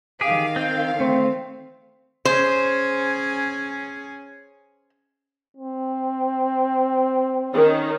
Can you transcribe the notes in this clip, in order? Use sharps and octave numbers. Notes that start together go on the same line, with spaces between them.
D#3 G4 G#4 F5
C4 G5
A3 C4
C#4 G#4 C5
C4
D#3 C#4